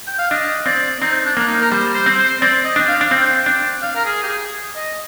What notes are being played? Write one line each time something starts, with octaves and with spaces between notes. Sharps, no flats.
G5
F5
D4 D#5
C4 D5
C4 D#4
D4
A#3 D4
D#4
A#4
G3 C5
C5
C4
C5
C4 D5
D#5
D4 G5
F5
D4
C4 G5
D4
F5
A#4
G#4
G4
G#4
D#5